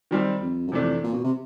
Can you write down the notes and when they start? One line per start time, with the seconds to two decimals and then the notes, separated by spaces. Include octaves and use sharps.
0.11 D#3 G3 C4
0.42 F2
0.68 F#2
0.72 F2 C3 E3 A3 D4
1.04 A#2
1.13 B2
1.24 C3